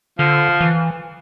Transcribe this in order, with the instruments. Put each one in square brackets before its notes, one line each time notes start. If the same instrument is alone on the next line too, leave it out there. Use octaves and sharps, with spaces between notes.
[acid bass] D3 [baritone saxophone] F3
[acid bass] E3